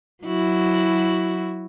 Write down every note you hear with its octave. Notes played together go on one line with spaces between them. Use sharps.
F#3 E4 F#4